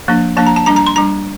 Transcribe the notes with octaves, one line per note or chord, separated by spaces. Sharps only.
F3 A#3 D4
F3 A#3 D4 A5
A#5
A5
G3 D4 A#5
A#5
C6
G3 D4 A#5